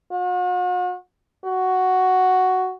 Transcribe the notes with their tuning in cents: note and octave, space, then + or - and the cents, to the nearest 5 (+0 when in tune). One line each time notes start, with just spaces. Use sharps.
F#4 -40
F#4 +5